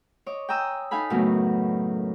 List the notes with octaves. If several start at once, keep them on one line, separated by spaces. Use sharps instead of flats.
C#5 D#5 D6
G5 G#5 A#5 D#6 E6
D#4 A4 F5 G#5 B5
F#2 A2 C#3 F#3 A#3 B3